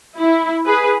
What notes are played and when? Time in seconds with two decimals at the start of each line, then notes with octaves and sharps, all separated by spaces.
0.17 E4
0.66 G#4 B4